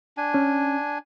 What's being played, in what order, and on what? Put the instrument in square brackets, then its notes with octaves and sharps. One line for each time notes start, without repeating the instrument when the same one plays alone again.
[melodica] D4 G#5
[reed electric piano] C#4